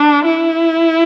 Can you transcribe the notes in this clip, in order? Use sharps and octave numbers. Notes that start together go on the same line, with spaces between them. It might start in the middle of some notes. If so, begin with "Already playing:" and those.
Already playing: D4
E4